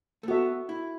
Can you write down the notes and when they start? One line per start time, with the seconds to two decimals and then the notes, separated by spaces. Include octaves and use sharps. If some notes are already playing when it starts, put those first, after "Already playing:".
0.23 A3
0.28 B3 F#4 A4 E5
0.69 E4